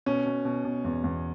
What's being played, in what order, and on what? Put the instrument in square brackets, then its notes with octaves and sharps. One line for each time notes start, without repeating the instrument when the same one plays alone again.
[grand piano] B2 C#4
B2
B2
B2
E2
E2